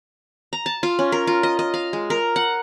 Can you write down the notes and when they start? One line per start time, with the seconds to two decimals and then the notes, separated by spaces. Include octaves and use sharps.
0.53 A#5
0.66 A5
0.83 F4
0.99 C#4
1.12 A#4
1.27 F4
1.43 D#5
1.59 D#5
1.74 F5
1.93 G#3
2.10 A#4
2.36 F#5